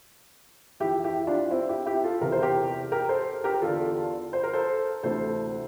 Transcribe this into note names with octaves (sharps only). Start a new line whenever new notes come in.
F2 E3 E4 G4
E4 G4
D4 F4
C4 E4
E4 G4
E4 G4
F4 A4
E2 C3 E3 A#4
C5
G4 A#4
G4 A#4
A4 C5
G4 A#4
A#4
E2 D3 F4 A4
C5
A#4
A4 C5
D2 C3 E3 A4 C5